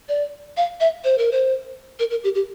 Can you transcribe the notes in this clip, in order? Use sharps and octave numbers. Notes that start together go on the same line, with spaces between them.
D5
F5
E5
C5
A#4
C5
A#4
A#4
G4
G4